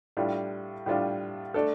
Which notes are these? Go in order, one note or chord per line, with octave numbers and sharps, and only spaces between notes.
A2 G3 D4 F4
A2 G3 D4 F4
A3 D4 A4